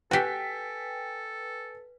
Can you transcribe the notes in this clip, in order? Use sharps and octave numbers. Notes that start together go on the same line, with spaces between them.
F#4 G4 A4 B4 G5 G#5 B6